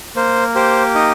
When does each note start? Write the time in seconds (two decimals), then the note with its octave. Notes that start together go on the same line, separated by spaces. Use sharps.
0.16 A#3 C5
0.55 G4 C5
0.95 D#4 D#5